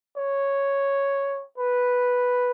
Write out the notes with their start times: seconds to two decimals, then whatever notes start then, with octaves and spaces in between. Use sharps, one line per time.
0.16 C#5
1.58 B4